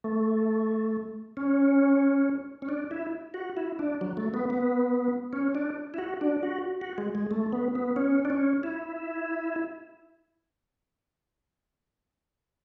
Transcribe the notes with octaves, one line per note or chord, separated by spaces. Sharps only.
A3
C#4
C#4
D4
E4
F#4
E4
D4
F#3
A3
B3
B3
C#4
D4
E4
F#4
D4
F#4
F#4
G#3
G#3
A3
B3
B3
C#4
D4
C#4
E4